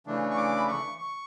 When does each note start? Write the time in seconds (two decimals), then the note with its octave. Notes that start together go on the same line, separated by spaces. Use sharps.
0.07 C#3 E3 A3 D4
0.31 C#6
0.37 D6
0.57 B5
0.68 C#6
0.98 C#6